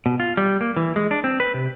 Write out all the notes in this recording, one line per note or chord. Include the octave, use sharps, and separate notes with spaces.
B2
F4
G3
A#3
E3
G#3
D4
C4
B4
C3